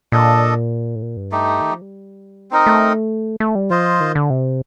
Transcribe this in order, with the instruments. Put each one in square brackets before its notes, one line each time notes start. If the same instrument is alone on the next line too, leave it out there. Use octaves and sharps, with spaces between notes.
[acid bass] A#2 [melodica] D4 A4 D#5
[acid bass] A2
A#2
G2
[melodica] A3 D#4 G4
[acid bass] D#3
F3
G3
[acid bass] A3 [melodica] C4 D#4 A#4 D#5
[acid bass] A3
A3
G3
[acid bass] F3 [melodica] F4 C5 D#5
[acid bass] D#3
D3
C3